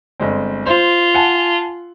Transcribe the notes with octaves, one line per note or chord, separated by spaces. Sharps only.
G1 G#3 C4
F4 C5
F#5 G#5 A5